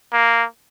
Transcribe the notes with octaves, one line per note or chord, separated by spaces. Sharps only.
A#3